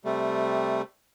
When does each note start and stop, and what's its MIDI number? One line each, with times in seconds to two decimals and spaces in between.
0.05 0.82 48
0.05 0.82 55
0.05 0.82 57